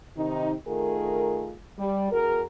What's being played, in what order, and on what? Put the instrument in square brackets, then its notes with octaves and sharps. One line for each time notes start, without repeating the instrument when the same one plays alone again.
[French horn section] C3 D#3 D#4
D#3 A3 F4 G#4 A#4
G3
E2 F#4 G#4 A#4